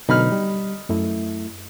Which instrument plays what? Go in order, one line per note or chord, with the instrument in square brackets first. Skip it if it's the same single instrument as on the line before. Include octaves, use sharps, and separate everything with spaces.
[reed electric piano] B2 D3 F#3 [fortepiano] D#4 B5 F6
[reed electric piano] G3
F#2 A3 E4